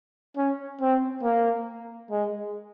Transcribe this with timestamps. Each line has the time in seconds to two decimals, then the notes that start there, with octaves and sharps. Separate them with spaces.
0.37 C#4
0.81 C4
1.24 A#3
2.11 G#3